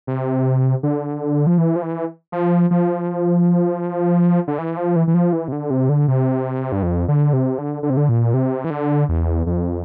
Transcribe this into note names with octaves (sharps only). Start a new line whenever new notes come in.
C3
D3
F3
E3
F3
E3
F3
F3
D3
E3
F3
E3
E3
F3
E3
C3
D3
C3
D3
C3
G2
F2
D3
C3
D3
D3
C3
D3
A#2
C3
E3
D3
E2
F2